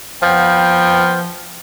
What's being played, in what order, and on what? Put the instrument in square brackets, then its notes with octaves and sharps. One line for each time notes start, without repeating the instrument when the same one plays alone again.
[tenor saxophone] F3 [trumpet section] B3 G5